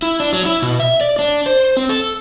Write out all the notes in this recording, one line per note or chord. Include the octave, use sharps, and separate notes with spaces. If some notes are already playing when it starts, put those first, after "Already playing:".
E4
D4
F#3
E4
B2
E5
D5
D4
C5
C4
A4